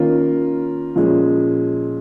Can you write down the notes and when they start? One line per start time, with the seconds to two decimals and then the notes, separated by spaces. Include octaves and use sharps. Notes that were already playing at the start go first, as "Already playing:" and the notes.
Already playing: D#3 A#3 C#4 F4 A#4
0.96 A#2 F3 G#3 C#4